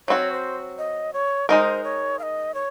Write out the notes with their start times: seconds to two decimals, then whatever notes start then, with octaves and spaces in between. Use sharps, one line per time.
0.08 F#3 C4 F#4 C#5
0.32 C5
0.78 D#5
1.13 C#5
1.49 G#3 D#4 A#4 C5
1.84 C#5
2.19 F5
2.23 D#5
2.54 C#5